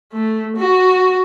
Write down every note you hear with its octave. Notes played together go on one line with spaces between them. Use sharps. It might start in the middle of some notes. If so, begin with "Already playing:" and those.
A3
F#4